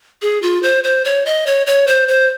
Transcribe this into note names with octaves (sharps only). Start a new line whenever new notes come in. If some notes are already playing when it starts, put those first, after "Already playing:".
G#4
F4
C5
C5
C#5
D#5
C#5
C#5
C5
C5